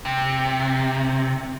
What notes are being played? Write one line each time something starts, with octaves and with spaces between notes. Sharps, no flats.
C3